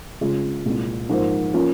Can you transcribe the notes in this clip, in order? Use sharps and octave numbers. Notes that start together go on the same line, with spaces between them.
C#3 G#3 C#4 F4
C2 A#2 G#3
G#2 F3 A#3 F4 C5
F3 A#3 C#4 F4